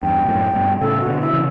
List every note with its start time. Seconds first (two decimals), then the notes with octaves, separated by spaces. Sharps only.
0.02 E2 G2 G5
0.25 B2
0.28 F#2 A2
0.55 G2 B2
0.81 A2 C#3 A4
1.01 F#4
1.07 B2 D3
1.20 E4
1.33 C#3 E3